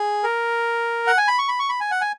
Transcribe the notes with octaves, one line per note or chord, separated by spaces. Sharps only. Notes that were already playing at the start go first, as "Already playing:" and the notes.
Already playing: G#4
A#4
F#5
G#5
B5
C#6
B5
C#6
B5
G#5
F#5
G#5